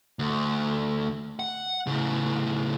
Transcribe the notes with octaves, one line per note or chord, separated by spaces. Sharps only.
D2
F#5
A2 C#3